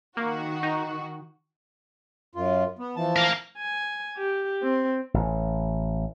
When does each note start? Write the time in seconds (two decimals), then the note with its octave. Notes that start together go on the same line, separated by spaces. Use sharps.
0.17 D#3 A#3 F#4
0.63 D#4
2.35 F#2 F4
2.79 B3
2.96 E3 F3 A5
3.16 A#4 F5
3.58 G#5
4.18 G4
4.62 C4
5.14 A1